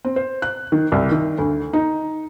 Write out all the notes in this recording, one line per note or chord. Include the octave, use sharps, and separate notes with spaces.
C4
C5
F#6
D#3
C2
D#3
D2
D#4